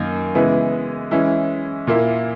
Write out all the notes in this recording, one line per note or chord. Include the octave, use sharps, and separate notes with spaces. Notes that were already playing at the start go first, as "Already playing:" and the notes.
Already playing: F#2 D#3 A#3
C#3 E3 G#3 B3 E4
E3 G#3 C#4 E4
A#2 A#3 E4